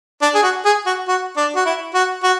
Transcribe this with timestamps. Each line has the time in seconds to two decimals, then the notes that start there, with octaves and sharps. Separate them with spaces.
0.22 D4
0.34 G#4
0.43 F#4
0.65 G#4
0.86 F#4
1.08 F#4
1.37 D4
1.56 F#4
1.66 E4
1.94 F#4
2.23 F#4